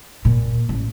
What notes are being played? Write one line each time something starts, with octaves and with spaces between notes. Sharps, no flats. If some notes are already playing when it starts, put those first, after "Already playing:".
A#2
A1